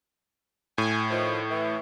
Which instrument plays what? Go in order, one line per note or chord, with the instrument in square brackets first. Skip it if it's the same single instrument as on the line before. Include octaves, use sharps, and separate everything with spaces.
[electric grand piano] A2 [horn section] G#5
[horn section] D#3 F3
E3